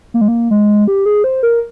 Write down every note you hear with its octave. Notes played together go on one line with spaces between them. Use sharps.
A#3
G#3
A#3
G#3
G4
G#4
C5
A#4